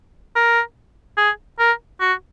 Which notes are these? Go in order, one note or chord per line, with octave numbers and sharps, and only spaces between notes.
A#4
G#4
A#4
F#4